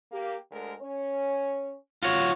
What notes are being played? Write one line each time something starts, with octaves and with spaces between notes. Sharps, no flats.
A#3 G4
D2 G#3 A#4
C#4 C#5
F4 F#4 C#5